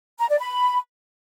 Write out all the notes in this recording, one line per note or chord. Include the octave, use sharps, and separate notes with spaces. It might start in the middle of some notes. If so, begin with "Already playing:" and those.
A#5
D5
B5